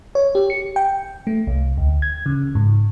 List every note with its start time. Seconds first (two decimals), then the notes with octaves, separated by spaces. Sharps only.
0.15 C#5
0.35 G4
0.50 C#7
0.76 G5
1.27 A3
1.47 C2
1.78 D2
2.02 G#6
2.26 C#3
2.55 G#2